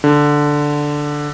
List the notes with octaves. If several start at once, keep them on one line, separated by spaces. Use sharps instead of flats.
D3